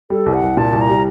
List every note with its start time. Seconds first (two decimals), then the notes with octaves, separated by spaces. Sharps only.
0.10 G3 A4
0.26 C2
0.34 F#5
0.42 C2
0.57 A#2 A5
0.73 C2
0.81 A#5
0.89 G3